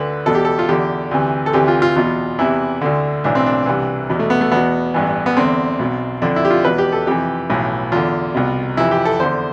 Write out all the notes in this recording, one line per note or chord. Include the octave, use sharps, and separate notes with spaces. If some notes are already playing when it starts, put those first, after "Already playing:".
Already playing: D2 D3 B4
E2 B2 A4
G4
A4
F4
E2 D3 G4
D2 C3 E3
A4
D2 C3 E3 G4
F4
F4
E2 B2 F4
E2 C3 E3 E4
D2 D3
B1 A2 E3 D4
C4
D4
C2 C3 E3
E2 B2
A3
B3
A3
E2 B2 B3
A1 G2 E3
B3
E2 D3 C4
B1 B2
F2 D3 D4
E4
G4
F4
E2 B2 B4
G4
A4
F2 C3 E3 G4
B1 A2 E3
E2 D3 F4
C2 B2
F2 C3 E3 E4
G4
A4
E2 D3 C5